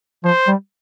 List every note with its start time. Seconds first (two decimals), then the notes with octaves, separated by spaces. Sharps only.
0.24 F3 C5
0.47 G3